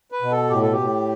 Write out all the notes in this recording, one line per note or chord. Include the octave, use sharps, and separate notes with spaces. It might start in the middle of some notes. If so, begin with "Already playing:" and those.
B4
B2
A4
A2 G4
A4
G4
A2